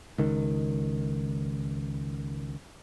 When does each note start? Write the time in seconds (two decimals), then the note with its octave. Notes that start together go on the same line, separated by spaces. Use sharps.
0.18 C#2 D#3